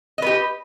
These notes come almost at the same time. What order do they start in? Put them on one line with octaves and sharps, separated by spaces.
D#5 B4 G4